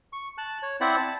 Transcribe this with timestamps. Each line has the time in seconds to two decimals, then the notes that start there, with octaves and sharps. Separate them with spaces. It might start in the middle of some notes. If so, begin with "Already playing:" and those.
0.13 C#6
0.38 A5 F#6
0.63 C#5
0.81 C4 E4 C5 D5 F#5 B5
0.97 A5